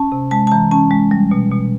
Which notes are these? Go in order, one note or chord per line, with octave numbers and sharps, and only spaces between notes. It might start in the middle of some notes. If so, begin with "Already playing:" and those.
Already playing: C#4 A5
C3
G#3 A5
A5
E3 A#5
C#4 A5
G#3
G3
B2
B2